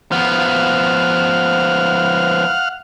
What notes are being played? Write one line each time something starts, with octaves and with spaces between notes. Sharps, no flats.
F3 B3 F5 F#5 F6